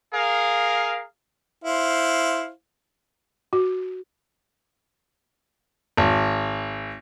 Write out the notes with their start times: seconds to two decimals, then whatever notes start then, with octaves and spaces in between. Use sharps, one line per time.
0.13 G#4 A#4 F5
1.64 E4 C5 F5
3.53 F#4
5.97 G#1